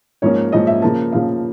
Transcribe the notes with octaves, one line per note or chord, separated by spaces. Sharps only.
G#2 F3 A#3 C#4 C#5
G#2 F3 A#3 C#4 D#5
E5
C#3 F3 A#3 A5
C#3 F3 A#3 F5